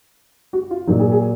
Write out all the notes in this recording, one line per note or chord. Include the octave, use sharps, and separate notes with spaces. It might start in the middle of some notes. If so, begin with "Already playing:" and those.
F#4
F4
A#2 F#3 D#4
G#4
G#4